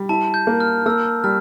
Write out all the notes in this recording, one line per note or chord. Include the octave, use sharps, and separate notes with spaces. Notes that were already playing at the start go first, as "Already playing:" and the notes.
Already playing: G3
E4 A5
G6
A#3
F6
A#3 E6
G3 F6